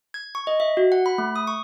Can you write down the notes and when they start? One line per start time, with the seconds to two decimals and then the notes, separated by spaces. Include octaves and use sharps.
0.14 G#6
0.35 C#6
0.47 D#5
0.60 E5
0.77 F#4
0.92 F#5
1.06 B5
1.18 A3
1.36 D#6
1.47 C#6